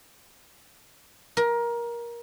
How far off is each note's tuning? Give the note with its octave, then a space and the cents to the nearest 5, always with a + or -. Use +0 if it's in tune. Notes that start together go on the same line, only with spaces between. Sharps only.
A#4 +20